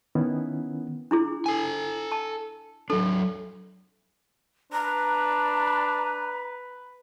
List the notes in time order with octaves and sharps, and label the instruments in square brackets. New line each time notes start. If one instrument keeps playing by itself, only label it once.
[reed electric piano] D#3 B3 C#4 E4
[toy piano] D4 E4 G#4
[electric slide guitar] A4 G#5
[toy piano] A5
[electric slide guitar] F#3 D4 [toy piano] A4
[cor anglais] D4 [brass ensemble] B4 [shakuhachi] A#5